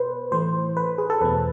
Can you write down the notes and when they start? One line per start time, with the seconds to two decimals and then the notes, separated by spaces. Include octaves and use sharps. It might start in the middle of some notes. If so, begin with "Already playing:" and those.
Already playing: B2 B4 C5
0.31 A2 E3 A3 C5
0.77 B4
0.98 G#4
1.10 A4
1.21 E2 B2 A3 B4